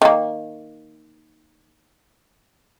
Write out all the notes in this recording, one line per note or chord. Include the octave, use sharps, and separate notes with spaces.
D#3 A#3